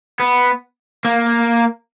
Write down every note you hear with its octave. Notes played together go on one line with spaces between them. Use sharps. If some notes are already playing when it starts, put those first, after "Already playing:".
B3
A#3